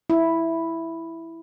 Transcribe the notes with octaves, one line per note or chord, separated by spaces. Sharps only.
E4